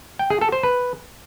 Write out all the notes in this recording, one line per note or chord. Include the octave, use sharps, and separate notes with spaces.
G5
G#4
A4
C5
B4